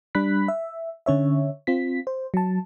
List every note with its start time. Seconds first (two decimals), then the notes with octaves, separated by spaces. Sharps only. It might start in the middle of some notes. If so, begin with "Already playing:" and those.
0.15 G3 D4 B5 F#6 B6
0.48 E5
1.06 D3 C#4 C#5 E5
1.67 C4 F4 B6
2.07 C5
2.34 F#3 A5